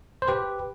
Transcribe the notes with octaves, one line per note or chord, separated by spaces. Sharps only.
C5
G4 B4